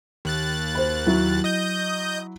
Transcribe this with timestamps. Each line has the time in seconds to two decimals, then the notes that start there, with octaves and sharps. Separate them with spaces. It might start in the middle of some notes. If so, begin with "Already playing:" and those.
0.25 D#2 F#6 A6
0.75 C5 B5
1.06 F#3 E4
1.44 D#5 D#6 G6